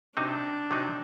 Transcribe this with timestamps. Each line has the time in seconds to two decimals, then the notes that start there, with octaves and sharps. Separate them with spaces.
0.17 C3 F#3 C4 D4 D#4
0.71 C3 F#3 C4 D#4